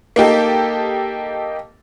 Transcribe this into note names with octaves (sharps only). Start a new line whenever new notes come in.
A#3 D#4 G4 A4